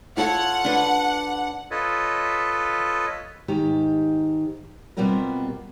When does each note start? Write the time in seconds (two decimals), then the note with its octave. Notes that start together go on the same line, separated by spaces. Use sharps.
0.17 F4 A4 C#5 F#5
0.65 D4 B4
1.71 F4 A4 B4 C#5 D#5
3.48 G#2 D#3 G4 A#5
4.97 B2 G3 B3 C4 F4 A#4